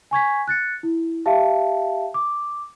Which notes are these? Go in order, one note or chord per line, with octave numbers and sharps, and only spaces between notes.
G#5 C#6 G#6 B6
F#6 A6 C#7
E4
G4 E5 F5 A5
D6